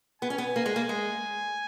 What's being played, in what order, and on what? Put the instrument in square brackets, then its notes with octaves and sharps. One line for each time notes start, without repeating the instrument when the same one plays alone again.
[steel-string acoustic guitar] B3 [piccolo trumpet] G#5
[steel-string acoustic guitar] C#4
B3
A#3
G#3
A#3
G#3